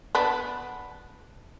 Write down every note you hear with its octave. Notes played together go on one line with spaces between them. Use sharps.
B3 D4